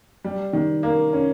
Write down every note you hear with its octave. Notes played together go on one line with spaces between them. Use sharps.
G3
D#3
A#3
C#4